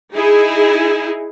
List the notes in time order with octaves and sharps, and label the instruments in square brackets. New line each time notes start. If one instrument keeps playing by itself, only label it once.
[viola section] D#4 E4 G#4